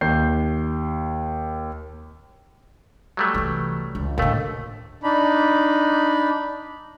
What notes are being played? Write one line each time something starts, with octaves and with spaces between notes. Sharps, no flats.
D#2 G6 C7
F#3 G3 A3
C2 E3
C#2
D#2 A2 D3 A3
D4 D#4 B5